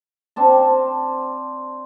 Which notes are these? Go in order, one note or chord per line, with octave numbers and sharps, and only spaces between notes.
C4 D4 A5